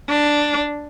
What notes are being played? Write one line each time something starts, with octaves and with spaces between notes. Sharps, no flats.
D4